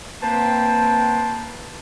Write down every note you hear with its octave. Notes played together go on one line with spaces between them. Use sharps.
A#3 C4 B4 C5 G5 A5